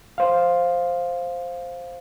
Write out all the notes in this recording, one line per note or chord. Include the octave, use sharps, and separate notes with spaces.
C5 F5